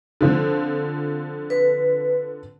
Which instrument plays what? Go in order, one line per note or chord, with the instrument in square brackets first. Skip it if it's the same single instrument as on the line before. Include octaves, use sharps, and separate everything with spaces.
[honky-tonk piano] D3 F3 C4
[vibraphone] B4